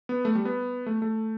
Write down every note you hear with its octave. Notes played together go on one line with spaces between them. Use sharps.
B3
A3
G3
B3
A3
A3